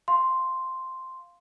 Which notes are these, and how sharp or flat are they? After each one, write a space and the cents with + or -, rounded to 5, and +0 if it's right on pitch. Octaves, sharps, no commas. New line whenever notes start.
F5 +0 C6 +0